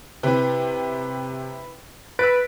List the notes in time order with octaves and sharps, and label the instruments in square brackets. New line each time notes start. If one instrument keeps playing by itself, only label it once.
[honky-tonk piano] C3 [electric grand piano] E4 B4
[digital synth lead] B4 [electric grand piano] E6 A6 [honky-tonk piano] D7